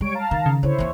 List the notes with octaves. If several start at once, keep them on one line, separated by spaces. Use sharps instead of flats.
G3 G#3 C#5 D7
F5 A5 A#5
D#3
C#3
D3 E4 C5 C#5
D#2 E3